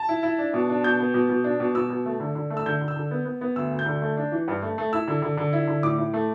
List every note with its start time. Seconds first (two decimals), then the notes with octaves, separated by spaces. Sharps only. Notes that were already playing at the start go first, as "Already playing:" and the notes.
Already playing: A5
0.09 E4
0.23 E4
0.38 D4
0.54 B2
0.70 D4
0.84 B2 G6
1.00 B3
1.14 B2
1.29 B2
1.44 D4
1.60 B2
1.75 B2 E6
1.90 B2
2.05 A3
2.20 D3
2.35 D3
2.50 A3
2.57 E6
2.66 D3 G6
2.81 D3
2.88 E6
2.96 D3
3.11 B3
3.26 B3
3.41 B3
3.56 D2 E6
3.71 D2
3.79 G6
3.86 D3
4.02 A3
4.17 D4
4.32 E3
4.48 G2
4.62 A3
4.78 A3
4.92 E4 E6
5.08 D3
5.22 D3
5.37 D3
5.53 E4
5.68 D3
5.83 A2 D6
5.98 A2
6.14 A3